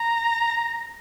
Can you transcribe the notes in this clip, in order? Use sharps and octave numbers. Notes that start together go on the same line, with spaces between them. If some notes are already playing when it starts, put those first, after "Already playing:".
Already playing: A#5